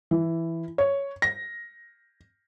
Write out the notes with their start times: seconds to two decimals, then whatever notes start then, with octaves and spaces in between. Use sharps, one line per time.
0.11 E3
0.78 C#5
1.22 A#6